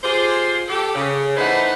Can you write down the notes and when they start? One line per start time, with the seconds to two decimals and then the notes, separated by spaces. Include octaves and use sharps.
0.03 F4 G4 G#4 C5
0.68 G4 A4
0.95 C#3
1.37 E3 A3 D#4 B4 C5 F#5